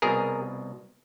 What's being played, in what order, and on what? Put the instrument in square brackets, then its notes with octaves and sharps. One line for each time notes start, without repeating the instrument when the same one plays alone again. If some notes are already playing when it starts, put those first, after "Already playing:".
[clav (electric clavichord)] C2 B2 G#4 A#4